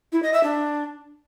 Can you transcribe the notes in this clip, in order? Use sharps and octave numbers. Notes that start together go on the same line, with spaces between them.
E4
D#5
E5
D4